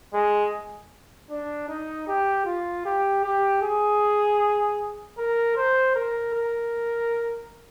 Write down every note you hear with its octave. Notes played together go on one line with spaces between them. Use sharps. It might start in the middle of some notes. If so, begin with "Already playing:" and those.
G#3
D4
D#4
G4
F4
G4
G4
G#4
A#4
C5
A#4
A#4